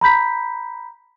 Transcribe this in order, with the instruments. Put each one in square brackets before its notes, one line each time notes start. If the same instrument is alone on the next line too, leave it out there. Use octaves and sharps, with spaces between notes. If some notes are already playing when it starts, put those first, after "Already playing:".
[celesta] A#5 B5 G6 B6